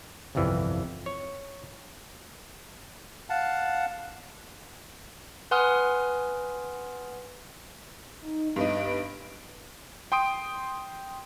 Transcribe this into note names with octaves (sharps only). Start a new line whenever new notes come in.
G1 C2 F2 E3
C#5
F5 F#5 A5
B4 F#5 G#5 C6 D#6 F6
D#4
G2 B3 D#4 D7
G5 C6 D#6 D7